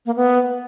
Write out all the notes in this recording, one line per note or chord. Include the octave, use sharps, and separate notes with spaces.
A#3
B3